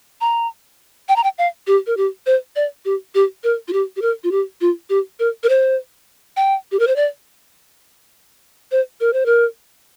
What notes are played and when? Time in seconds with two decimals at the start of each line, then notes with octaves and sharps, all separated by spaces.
0.21 A#5
1.09 G5
1.16 A#5
1.24 G5
1.38 F5
1.67 G4
1.87 A#4
1.97 G4
2.26 C5
2.56 D5
2.85 G4
3.15 G4
3.44 A#4
3.68 F4
3.73 G4
3.96 G4
4.02 A#4
4.24 F4
4.31 G4
4.61 F4
4.90 G4
5.19 A#4
5.43 A#4
5.49 C5
6.36 G5
6.72 G4
6.79 A#4
6.87 C5
6.96 D5
8.71 C5
9.00 A#4
9.13 C5
9.26 A#4